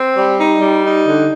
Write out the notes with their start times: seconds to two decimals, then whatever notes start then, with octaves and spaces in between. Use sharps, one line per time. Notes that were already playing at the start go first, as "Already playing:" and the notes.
Already playing: C4
0.15 G3
0.38 D#4
0.61 G3
0.84 D#4
1.06 D3